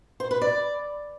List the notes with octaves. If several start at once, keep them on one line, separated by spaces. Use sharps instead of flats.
C5
B4
D5